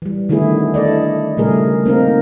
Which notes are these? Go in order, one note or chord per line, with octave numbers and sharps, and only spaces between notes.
E3 G3
D3 D#3 A3 B3 E4 G#4
E4 A4 D5 D#5
A#2 C#3 G3 A3 G#4 A#4
A#3 C4 D#4 A#4